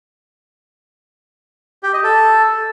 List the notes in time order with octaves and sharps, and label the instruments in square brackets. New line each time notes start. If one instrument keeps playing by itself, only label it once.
[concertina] G4
D#5
A4